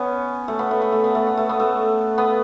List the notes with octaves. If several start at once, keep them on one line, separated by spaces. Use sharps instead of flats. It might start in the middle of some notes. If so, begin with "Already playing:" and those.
Already playing: B3 C#4
A3
B3
A3
B3
A3
B3
A3
B3
A3
B3
A3
B3